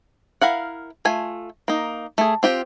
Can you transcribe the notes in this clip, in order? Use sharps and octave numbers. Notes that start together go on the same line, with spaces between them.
E4 A#4 F5 F#5
A3 F4 G#5
A#3 D#4
A3 G#4
C4 F4 G4